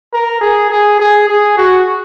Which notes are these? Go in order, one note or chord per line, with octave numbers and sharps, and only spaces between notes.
A#4
G#4
G#4
G#4
G#4
F#4